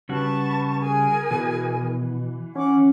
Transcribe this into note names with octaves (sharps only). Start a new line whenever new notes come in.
C#3 G3 F#4 B4 A5 C#6
G#4 A#4 G#5
B2 E3
C#4 F#5 D6